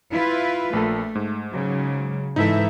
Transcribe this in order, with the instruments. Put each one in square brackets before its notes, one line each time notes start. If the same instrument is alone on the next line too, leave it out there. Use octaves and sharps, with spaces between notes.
[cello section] E4 F4 B4
[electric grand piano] A#1 A#3 A4 [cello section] A3
[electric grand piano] G#2
[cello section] C#3 F#3
[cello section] G#2 E3 E5 [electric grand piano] D#4 E4 A4